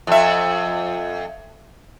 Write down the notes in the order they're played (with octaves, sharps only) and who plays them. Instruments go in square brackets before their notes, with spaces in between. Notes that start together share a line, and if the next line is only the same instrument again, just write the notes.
[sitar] F2 E5